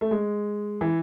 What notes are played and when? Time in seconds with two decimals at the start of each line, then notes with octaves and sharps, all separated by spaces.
0.01 A3
0.11 G#3
0.81 E3